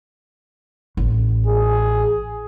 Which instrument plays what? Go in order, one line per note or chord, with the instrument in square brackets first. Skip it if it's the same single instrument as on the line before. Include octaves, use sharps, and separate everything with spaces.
[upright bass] A1
[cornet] G#4